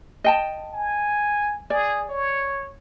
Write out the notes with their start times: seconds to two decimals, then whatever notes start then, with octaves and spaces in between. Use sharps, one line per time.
0.24 D#5 G5 A5
0.73 G#5
1.70 G#4 D5
2.09 C#5